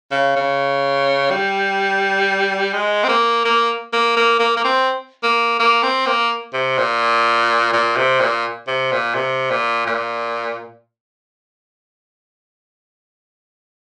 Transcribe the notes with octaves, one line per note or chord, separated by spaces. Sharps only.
C#3
C#3
G3
G#3
C4
A#3
A#3
A#3
A#3
A#3
A#3
C4
A#3
A#3
C4
A#3
C3
A#2
A#2
C3
A#2
C3
A#2
C3
A#2
A#2